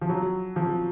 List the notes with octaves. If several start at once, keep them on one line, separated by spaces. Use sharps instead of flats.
F3
F#3
F3